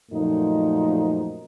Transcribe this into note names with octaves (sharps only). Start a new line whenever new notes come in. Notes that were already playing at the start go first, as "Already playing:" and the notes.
F#2 A#2 F3 A3 D#4